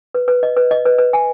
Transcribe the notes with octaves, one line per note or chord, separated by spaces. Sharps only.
B4
B4
D#5
B4
D#5
B4
B4
G#5